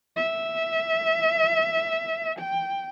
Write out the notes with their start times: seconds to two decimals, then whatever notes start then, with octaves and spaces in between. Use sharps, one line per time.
0.17 E5
2.39 G5